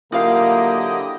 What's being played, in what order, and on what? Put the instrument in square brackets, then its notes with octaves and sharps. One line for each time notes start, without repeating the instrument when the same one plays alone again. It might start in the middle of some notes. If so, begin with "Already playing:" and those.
[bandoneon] D3 F#3 E4 [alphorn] A#3 [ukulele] F4 F5 [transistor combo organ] G4 D#5